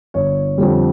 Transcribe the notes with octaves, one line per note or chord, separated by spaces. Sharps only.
G1 C#5
F2 D3 G3